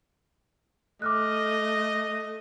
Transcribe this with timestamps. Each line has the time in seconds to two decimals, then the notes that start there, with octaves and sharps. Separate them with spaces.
1.02 A3 D#5 D6 F6 F#6